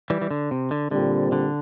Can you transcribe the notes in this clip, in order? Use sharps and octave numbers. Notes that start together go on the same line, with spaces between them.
E3 G3
E3
D3
C3
D3
A#2 D3 G3 C4
D3